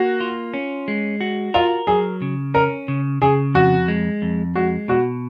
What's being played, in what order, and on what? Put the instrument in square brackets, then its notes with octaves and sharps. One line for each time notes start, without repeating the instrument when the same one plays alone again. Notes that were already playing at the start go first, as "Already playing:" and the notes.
Already playing: [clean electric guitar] A#3 [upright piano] F#4
[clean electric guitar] F4
C#4
G#3
F#4
[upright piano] F4 [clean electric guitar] A#4
[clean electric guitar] F#3 [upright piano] G#4
[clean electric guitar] C#3
[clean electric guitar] C#4 [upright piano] A#4
[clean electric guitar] C#3
[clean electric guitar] C#3 [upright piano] G#4
[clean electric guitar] F2 [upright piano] F#4
[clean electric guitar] G#3
F2
[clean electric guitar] G#3 [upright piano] F#4
[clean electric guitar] B2 [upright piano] F#4